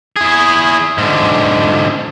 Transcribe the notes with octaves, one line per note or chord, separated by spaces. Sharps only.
E4 G#4
G#2 D3